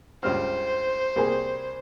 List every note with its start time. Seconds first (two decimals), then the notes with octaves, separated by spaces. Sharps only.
0.23 C#2 G2 C5 F6
1.16 C2 A#3 G#4